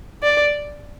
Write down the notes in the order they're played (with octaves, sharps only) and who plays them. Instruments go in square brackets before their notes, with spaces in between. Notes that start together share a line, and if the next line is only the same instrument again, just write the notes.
[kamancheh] D5